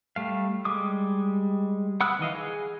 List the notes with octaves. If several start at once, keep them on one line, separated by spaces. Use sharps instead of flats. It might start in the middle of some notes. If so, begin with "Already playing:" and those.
G3 A3 F5
G3 G#3 D6 D#6
F#5 B5 D#6 E6 F#6
D#3 E3 D#5 F5
G#4